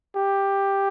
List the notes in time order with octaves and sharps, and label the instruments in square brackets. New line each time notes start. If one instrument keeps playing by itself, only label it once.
[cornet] G4